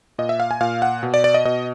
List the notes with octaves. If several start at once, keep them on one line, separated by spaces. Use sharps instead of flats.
A#2 D#5
E5
F5
G#5
A#2 F5
F#5
B2
D5
D5
D#5
B2 D#5